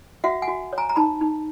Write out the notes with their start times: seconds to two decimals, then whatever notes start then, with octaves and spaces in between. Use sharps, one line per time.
0.24 F#4 E5 F#5
0.42 F#5 G#5
0.48 F#4
0.73 C#5
0.78 G#5 A#5
0.89 A#5
0.96 D#4 A5 B5
1.21 D#4